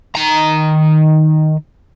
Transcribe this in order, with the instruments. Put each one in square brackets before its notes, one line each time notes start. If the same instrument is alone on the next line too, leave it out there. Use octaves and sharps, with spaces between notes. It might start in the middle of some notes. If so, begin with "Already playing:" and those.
[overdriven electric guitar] D#3 A#5